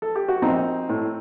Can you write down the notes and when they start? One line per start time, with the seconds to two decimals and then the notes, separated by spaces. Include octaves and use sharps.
0.02 A4
0.15 G4
0.28 F#4
0.42 A#1 C4 D#4
0.89 A2